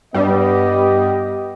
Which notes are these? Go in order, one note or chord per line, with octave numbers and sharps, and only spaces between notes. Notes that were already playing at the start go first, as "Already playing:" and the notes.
G2 G3 B3 G4 D#5